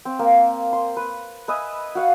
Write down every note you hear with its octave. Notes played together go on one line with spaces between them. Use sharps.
C4
A#3
C6
B4
B4 D#5 E5 G#5
F#4 F5 F#5